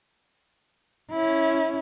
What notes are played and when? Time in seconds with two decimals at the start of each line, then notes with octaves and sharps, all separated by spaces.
1.11 C#4 E4